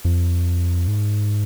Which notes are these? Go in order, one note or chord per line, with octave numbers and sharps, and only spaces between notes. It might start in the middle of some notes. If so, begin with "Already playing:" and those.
F2
G#2